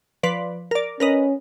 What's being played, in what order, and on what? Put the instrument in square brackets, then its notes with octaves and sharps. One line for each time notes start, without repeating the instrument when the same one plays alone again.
[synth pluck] F3 B4 D5
A#4 D5
[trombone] C#4 [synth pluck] A#4 B4 D#5